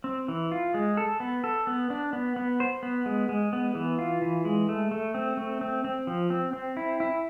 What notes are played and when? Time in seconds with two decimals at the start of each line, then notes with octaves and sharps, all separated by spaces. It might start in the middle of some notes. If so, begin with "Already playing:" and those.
0.04 C4
0.28 E3
0.52 F4
0.74 G#3
0.97 A4
1.20 B3
1.44 A4
1.67 B3
1.90 D4
2.13 B3
2.36 B3
2.60 C5
2.83 B3
3.06 G#3
3.29 G#3
3.53 B3
3.75 E3
3.99 F4
4.22 E3
4.45 G#3
4.69 A3
4.91 A3
5.14 C4
5.37 A3
5.61 C4
5.84 C4
6.07 F3
6.30 C4
6.53 C4
6.77 E4
7.00 E4